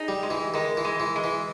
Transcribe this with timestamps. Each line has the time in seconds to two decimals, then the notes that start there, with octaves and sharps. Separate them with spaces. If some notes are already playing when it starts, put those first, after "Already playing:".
Already playing: D#4 G#4
0.08 G3
0.23 G#3
0.30 E3
0.54 D#3 G#3
0.77 E3
0.85 G#3
1.00 E3
1.16 G#3
1.24 E3